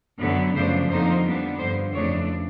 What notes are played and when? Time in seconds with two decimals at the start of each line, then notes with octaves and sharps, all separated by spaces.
0.20 F#2 D3 F#3 B3
0.54 F#2 C#3 F3 A3 D4 C5
0.89 F2 D3 F3 A#3 D#4 C5
1.24 D3 G3 B3 D4
1.58 G2 D3 F3 C5
1.94 F2 C#3 E3 A3 D4 C#5